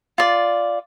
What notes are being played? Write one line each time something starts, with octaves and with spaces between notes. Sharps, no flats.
F4 D5